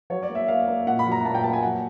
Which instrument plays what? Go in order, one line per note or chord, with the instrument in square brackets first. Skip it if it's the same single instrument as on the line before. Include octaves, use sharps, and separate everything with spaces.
[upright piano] F#3 C#5
D5
A#3
E5
A#3 F5
A#3
A#2 F#5
B5
F#3
A#5
A#2 A5
G5
A#3 A5
G#5
F#3 F#5